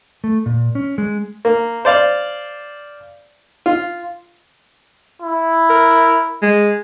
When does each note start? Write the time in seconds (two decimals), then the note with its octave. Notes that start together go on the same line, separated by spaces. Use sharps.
0.24 A3
0.46 A#2
0.75 C#4
0.98 G#3
1.45 A#3
1.85 C5 D5 F5
3.66 F4
5.22 E4
5.70 A#4
6.42 G#3